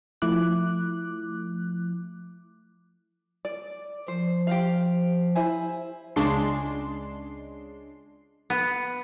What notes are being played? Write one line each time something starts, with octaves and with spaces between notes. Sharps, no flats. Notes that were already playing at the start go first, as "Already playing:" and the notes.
F3 A3 E4 D6 F#6
D5
F3 C5
G4 C5 F5
E4 C5 G#5
C#2 C#3 G#3 D4 C6 C7
B3